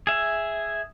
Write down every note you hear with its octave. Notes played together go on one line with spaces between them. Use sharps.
G#4 E5